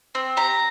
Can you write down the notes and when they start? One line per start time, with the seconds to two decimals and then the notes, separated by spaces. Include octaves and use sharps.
0.15 C4
0.37 G4 A#5